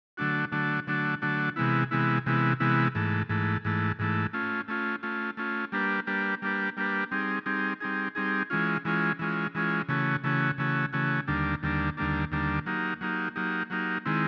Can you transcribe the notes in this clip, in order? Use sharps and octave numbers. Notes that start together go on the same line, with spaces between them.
D3 F#3 A3 D4 F#4
D3 F#3 A3 D4 F#4
D3 F#3 A3 D4 F#4
D3 F#3 A3 D4 F#4
C3 E3 G#3 B3 E4
C3 E3 G#3 B3 E4
C3 E3 G#3 B3 E4
C3 E3 G#3 B3 E4
G#2 E3 A3
G#2 E3 A3
G#2 E3 A3
G#2 E3 A3
A3 C#4 F4
A3 C#4 F4
A3 C#4 F4
A3 C#4 F4
G3 A#3 D4 G4 B4
G3 A#3 D4 G4 B4
G3 A#3 D4 G4 B4
G3 A#3 D4 G4 B4
G3 C4 D#4 G#4
G3 C4 D#4 G#4
G3 C4 D#4 G#4
G3 C4 D#4 G#4
E3 G#3 C#4 F4
E3 G#3 C#4 F4
E3 G#3 C#4 F4
E3 G#3 C#4 F4
C#3 E3 A3 C#4 F#4
C#3 E3 A3 C#4 F#4
C#3 E3 A3 C#4 F#4
C#3 E3 A3 C#4 F#4
D#2 D3 G3 A#3 D4
D#2 D3 G3 A#3 D4
D#2 D3 G3 A#3 D4
D#2 D3 G3 A#3 D4
F#3 A#3 D#4 G4
F#3 A#3 D#4 G4
F#3 A#3 D#4 G4
F#3 A#3 D#4 G4
D#3 G#3 C4 E4